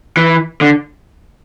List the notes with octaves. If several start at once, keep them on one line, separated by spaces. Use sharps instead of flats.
E3
D3